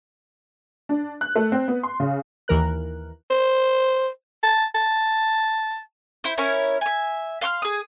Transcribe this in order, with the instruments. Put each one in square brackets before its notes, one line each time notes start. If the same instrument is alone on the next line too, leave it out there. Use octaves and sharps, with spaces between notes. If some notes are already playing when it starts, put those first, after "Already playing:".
[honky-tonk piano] D4
F#6
A3
C4
B3
C6
C#3
[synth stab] D#2 E3 A#4 F#6
[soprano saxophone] C5
A5
A5
[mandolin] E4 C5
C#4 E4 A#4 C#5
E5 G#5
F5 C6 C#6 F6
G#4 D#6